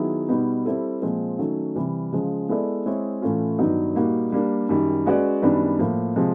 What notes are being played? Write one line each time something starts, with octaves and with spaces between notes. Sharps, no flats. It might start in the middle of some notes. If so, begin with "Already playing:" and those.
Already playing: D#3 F#3 B3 E4 G#4
B2 G3 B3 D#4
G3 C4 E4 A4
A#2 F3 G#3 C4
D#3 F#3 A3 C#4
C3 E3 G3
C#3 F3 G#3
G#3 B3 E4 A4 D5
G#3 C4 E4 G#4 C#5
A2 E3 A3 C#4 F4
G2 D#3 F#3 B3 D#4
A#2 G3 A#3 D#4 F#4
G3 A#3 D4
F#2 D#3 G3
G#3 C#4 F#4 B4 D5
F#2 D#3 G3 B3 D4
A2 F3 A#3
C3 F3 G#3